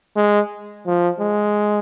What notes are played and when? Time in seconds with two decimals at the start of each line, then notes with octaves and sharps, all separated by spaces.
0.16 G#3
0.86 F3
1.20 G#3